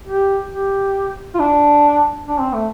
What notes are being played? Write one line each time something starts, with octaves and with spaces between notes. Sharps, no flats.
G4
G4
F4
D4
D4
C4
A3